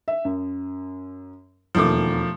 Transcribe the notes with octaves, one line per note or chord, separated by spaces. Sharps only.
E5
F#2
E1 D#2 F3 A3 D6